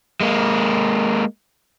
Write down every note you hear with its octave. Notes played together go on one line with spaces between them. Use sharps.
G#3 A#3